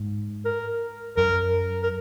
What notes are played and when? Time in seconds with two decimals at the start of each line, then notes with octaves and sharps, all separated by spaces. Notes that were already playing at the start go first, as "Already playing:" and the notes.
Already playing: G#2
0.45 A#4
1.17 F#2 A#4
1.83 A#4